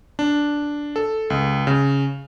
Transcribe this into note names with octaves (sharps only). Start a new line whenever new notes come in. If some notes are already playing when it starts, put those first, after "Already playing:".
D4
A4
C#2
C#3